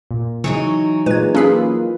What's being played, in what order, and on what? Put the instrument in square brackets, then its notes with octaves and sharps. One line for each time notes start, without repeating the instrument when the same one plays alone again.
[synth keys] A#2
[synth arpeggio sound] C#3 [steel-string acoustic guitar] E3 F#3 D#4 [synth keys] C#6
[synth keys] A#2 G#3 [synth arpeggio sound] B4 G#6
[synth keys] A#3 F4 B4 [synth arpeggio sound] C#4 G#4 E6